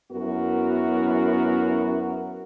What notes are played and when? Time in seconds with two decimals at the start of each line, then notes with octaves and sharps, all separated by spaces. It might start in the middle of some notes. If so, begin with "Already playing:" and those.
0.11 F#2 B3 E4 F#4 A#4